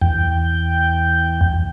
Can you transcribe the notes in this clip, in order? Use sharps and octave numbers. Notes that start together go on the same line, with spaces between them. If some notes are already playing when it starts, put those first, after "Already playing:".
E2 G5